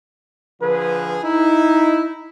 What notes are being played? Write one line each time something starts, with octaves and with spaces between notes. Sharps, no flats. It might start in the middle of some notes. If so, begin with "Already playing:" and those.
D3 F3 G#4 B4
D#4 E4